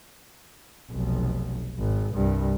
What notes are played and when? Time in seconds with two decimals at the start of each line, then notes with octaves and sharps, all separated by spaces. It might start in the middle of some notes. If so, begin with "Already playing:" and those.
0.92 F1 B1
1.80 G#1
2.15 C2 G2